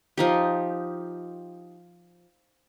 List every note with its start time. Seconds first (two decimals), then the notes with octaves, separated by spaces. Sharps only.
0.17 F3 D#4 G4